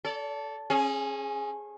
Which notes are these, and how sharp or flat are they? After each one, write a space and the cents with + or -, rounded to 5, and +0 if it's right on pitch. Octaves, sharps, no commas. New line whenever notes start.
A4 +0 D5 -40
C#4 -35 G#4 +5